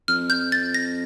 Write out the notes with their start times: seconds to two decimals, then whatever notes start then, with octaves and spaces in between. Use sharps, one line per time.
0.08 F2 F6
0.30 G6
0.52 A6
0.74 A#6